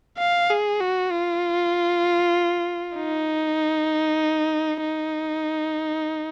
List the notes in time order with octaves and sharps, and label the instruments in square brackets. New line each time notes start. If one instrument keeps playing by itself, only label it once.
[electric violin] F5
G#4
F#4
F4
D#4
D#4